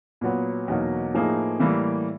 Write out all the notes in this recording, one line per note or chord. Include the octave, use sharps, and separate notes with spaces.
A#2 F#3 B3
E2 B2 F#3 A#3 D#4
A2 F3 A#3 D#4 G#4
A2 E3 G3 A#3